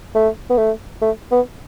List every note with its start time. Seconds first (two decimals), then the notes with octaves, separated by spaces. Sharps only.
0.15 A3
0.50 B3
0.58 A3
1.02 A3
1.31 B3